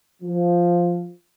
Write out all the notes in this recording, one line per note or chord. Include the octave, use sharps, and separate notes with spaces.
F3